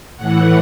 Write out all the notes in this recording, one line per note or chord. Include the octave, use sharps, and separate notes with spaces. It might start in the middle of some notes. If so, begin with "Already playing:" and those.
A2 E3 F#5